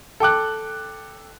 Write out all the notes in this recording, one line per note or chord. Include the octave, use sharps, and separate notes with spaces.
A4 G5 D6 F#6